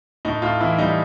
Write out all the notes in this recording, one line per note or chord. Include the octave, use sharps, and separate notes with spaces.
A2 D#4
A2 F4
E3 E4
G3 D#4